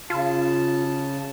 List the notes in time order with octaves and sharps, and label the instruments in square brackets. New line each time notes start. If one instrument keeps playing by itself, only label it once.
[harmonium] C#3 A5 [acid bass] F4